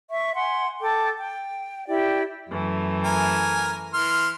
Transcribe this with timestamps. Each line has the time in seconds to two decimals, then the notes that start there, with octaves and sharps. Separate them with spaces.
0.11 E5 C#6
0.35 F#5 G#5 C6
0.80 A4 G5 D6
1.18 G5
1.87 E4 G4 D5 G5
2.49 F#2 E3 A3
3.05 A#4 G#5
3.94 E3 C6 F6